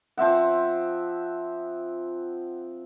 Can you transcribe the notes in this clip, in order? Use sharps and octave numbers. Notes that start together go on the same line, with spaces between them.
F3 C4 E5 F#5